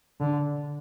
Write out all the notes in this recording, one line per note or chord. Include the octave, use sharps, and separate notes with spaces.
D3